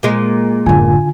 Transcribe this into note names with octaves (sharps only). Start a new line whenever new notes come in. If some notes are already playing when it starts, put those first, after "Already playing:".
A#2 G#3
F#1 A2 D3 F4 G#5